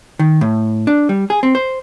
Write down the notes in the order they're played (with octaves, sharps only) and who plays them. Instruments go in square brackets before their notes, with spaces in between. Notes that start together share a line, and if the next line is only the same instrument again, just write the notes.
[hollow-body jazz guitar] D#3
A2
D4
G3
G#4
C4
C5